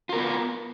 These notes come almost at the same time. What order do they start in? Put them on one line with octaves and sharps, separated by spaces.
F4 A#4 B3